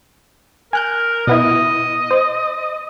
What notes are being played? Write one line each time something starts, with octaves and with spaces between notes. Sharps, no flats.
A#4 G#5 F#6 G6
B2 B3 E4 D#5
C5